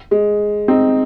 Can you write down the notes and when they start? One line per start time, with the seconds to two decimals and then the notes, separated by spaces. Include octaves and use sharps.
0.11 G#3
0.68 C4 D#4